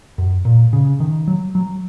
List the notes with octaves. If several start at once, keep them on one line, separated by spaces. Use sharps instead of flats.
F#2
A#2
C#3
D#3
F#3
F#3